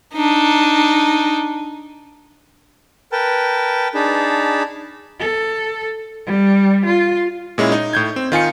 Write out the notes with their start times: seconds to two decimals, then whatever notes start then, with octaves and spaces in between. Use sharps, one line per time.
0.15 D4 D#4
3.12 A#4 B4 G5 A5
3.95 D4 D#4 G#4 A5 B5
5.19 A4
6.26 G3
6.86 F4
7.58 A#2 G#3 C#4 E4
7.72 D#4
7.93 A2 G6 G#6
8.16 C4
8.32 D#3 F4 G#5 C#7